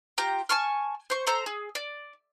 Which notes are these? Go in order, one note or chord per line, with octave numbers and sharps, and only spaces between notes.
F4 G4 A#5
G#5 A5 C#6 F6
C5 C#6
A4 C5 A#5 E6
G#4
D5